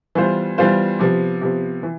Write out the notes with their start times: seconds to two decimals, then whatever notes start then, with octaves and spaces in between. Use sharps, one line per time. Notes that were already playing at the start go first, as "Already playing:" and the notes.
0.15 E3 G3 B3 F4 C5
0.58 E3 G3 B3 F4 C5
0.99 C3 F3 B3
1.41 C3 F3 B3
1.83 E3